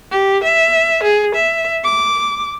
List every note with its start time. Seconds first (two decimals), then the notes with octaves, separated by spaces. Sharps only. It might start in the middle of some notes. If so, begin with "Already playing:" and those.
0.11 G4
0.44 E5
1.03 G#4
1.35 E5
1.84 D6